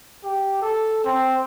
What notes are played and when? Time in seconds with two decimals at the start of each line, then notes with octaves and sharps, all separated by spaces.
0.24 G4
0.62 A4
1.05 C4